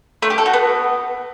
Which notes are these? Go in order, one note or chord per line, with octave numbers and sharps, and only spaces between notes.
A3
G4
A4
F#4
B3